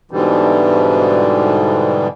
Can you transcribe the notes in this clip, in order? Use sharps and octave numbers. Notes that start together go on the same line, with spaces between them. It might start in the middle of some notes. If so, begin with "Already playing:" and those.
G#2 B2 D3 E3 G3